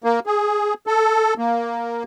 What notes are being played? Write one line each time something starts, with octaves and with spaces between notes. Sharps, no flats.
A#3
G#4
A4
A#3